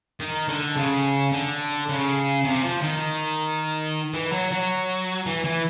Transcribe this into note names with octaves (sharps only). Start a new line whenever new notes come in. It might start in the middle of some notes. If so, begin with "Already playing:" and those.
D#3
D3
C#3
D3
C#3
C3
F3
D#3
E3
F#3
F#3
E3
E3